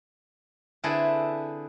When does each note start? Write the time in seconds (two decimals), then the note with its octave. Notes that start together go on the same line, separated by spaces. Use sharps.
0.84 D3 C4 E4 G#4 A4 B4